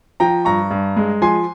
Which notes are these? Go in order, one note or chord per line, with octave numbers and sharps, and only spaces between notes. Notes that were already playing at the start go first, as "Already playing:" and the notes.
F3 G5 A#5
G2 A#5 C#6
G2
G#3
F3 G#5 C6